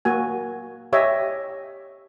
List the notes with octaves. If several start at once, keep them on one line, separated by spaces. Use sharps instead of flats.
A#3 F#4 G#5
G4 C#5 D#5 E5